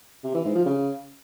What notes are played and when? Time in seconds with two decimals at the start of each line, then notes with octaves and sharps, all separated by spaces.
0.24 C3
0.34 E3
0.45 G#2
0.55 F3
0.66 C#3